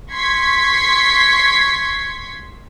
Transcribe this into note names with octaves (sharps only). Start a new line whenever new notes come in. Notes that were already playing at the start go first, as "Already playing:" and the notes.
C6 C#6 G#6 B6